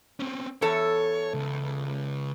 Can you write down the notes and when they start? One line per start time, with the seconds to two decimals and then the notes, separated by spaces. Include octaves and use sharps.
0.20 C4 C#4
0.62 E2 A4 C#5
1.34 C#2